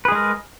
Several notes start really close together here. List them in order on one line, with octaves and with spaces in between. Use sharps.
B4 G#4 G#3 A#4